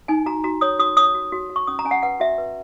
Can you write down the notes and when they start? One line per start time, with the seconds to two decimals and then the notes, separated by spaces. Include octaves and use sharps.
0.08 D#4 G#5
0.26 F#4 A#5
0.44 F#4 A#5
0.61 C#5 D#6
0.79 F#4 D#6
0.97 C#5 D#6
1.14 F#4
1.32 F#4
1.50 F#4
1.56 C#6
1.67 C#4 D#6
1.79 A#5
1.85 C#4 G#5
1.91 F#5
2.03 B4 F#5
2.20 F#4 E5
2.38 B4